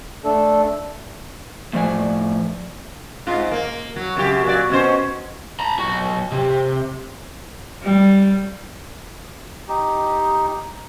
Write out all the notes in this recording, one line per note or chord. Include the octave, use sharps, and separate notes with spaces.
A3 D4 A4
A2 F3 D5 G#5
G#2 F4
A#3
F#3
F#2 C#3 G4
A#2 F#3 D5
B2 C#4 C5
A#5 B5
B1 F#4
C3
G3
D#4 G4